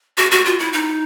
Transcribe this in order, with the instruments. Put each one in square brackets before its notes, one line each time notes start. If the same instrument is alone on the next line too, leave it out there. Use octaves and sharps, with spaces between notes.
[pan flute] F#4
F#4
F4
E4
D#4